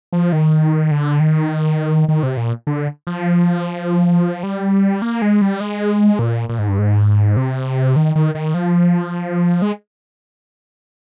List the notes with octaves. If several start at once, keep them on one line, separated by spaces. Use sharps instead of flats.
F3
D#3
D3
D#3
D#3
C3
A#2
D3
F3
G3
A#3
G#3
G3
G#3
A#2
A#2
G#2
G2
G#2
C3
D#3
D#3
D#3
F3
G#3